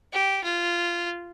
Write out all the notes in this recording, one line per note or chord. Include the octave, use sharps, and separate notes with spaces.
G4
F4